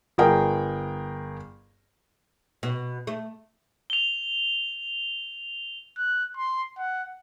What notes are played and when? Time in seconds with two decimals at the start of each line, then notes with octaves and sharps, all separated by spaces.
0.18 G1 G#4 A#4 G5
2.63 B2
3.07 A3
3.90 F7 G7
5.97 F#6
6.37 C6
6.78 F#5